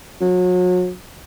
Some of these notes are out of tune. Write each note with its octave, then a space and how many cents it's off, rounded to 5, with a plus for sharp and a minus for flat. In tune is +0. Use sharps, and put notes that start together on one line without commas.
F#3 -35